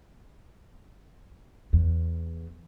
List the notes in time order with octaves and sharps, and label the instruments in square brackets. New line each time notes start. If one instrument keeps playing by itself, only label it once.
[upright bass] E2